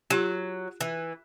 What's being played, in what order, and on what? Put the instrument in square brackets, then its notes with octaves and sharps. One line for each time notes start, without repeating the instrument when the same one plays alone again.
[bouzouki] F#3 [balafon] F4 G4
[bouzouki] E3